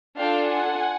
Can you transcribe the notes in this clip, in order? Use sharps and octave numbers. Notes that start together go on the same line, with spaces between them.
D4 F4 A4 F5 G5
F#5 G#5